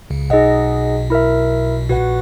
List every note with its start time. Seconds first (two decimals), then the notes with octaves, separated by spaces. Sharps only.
0.10 C#2 C#3
0.30 B1 B2 D#4 G#4 D#5 F#5
1.10 E4 A#4 E5
1.89 A#1 A#2 F#4 B4 F#5